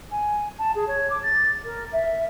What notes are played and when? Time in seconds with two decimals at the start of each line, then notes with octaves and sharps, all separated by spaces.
0.11 G#5
0.58 A5
0.75 G#4
0.87 C#5
1.10 D6
1.23 A6
1.65 A#4
1.92 E5